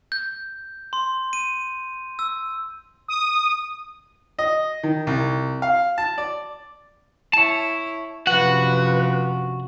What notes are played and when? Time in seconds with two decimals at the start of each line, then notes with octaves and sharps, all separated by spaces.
0.12 G6
0.93 C6
1.33 D#7
2.19 E6
3.08 D#6
4.39 D#5
4.83 D#3
5.07 C2
5.62 F5
5.98 A5
6.18 D5
7.33 E4 C#5 A5
8.27 F#2 C3 F3 F#4 B4 F#5